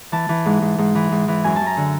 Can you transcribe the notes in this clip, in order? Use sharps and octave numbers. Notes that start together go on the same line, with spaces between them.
E3 A5
E3
G#2
G#2
G#2
E3
G#2
E3
F#2 G#5
F#2 A5
A#5
D3